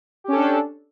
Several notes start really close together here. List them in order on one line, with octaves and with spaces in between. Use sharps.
G4 C#4 A4 D4